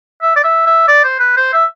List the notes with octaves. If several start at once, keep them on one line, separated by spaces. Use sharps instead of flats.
E5
D5
E5
E5
D5
C5
B4
C5
E5